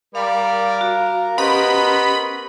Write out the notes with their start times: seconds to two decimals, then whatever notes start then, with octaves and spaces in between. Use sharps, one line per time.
0.15 G3 A#4 F5
0.79 F#4 F5
1.38 B3 C#4 G4 C5 D#5 B5